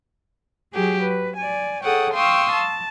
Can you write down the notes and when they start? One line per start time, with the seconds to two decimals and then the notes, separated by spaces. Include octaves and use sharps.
0.73 F#3 G4 G#4
1.04 B4
1.37 D5 G#5
1.83 G#4 A4 C#5 F#5 G5 D#6
2.14 F5 G5 C6 C#6 D#6 E6
2.52 A5